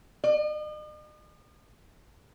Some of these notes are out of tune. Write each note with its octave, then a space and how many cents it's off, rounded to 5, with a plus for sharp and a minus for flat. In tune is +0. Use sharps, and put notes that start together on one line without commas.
D#5 -45